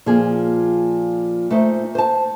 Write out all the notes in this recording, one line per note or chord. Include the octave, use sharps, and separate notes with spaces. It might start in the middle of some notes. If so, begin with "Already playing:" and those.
A#2 F3 G#4
A3 D#4 C5
C5 A5